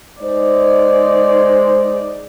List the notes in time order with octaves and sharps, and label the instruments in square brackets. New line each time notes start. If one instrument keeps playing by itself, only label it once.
[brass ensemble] G#3 C5 [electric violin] D#4 D5